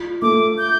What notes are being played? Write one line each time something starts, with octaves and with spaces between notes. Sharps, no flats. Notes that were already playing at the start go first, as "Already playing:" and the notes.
Already playing: F4
A3 D6
G6